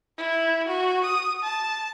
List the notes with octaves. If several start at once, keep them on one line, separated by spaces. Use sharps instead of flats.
E4
F#4
D#6
A5